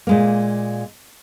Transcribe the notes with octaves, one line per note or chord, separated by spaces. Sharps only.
A#2 G#3 A#3